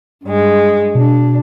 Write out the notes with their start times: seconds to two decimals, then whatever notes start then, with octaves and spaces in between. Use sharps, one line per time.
0.24 G2 G#3
0.95 B2 D4